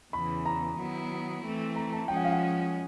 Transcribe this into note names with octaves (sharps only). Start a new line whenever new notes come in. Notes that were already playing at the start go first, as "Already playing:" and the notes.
E2 C#3 E3 B5
A#5
D#3 F#3 B3 E4
E3 A3 C4
A#5
A5
F3 G#3 C#4 G5
F#5
F5
F#5